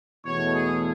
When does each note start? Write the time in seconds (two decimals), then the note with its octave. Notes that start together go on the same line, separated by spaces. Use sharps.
0.25 E2 B2 A3 C#5
0.55 G#4